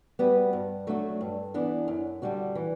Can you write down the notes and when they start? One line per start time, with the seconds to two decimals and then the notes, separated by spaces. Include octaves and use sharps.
0.19 G3 B3 F#4 B4
0.53 G2
0.87 F#3 A3 D4 F#4
1.21 G2
1.54 E3 B3 D4
1.88 F#2
2.22 D3 G3 D4 F#4
2.55 E3